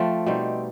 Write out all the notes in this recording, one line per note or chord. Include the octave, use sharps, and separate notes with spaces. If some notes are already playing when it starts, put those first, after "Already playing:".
Already playing: F3 A3 C4
B2 G3 C4 D#4